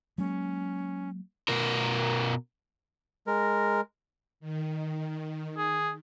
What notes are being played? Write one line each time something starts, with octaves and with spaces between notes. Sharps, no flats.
F#3 G#3 A#3 C#4
B2 A#4
G#3 A#4
D#3
G#4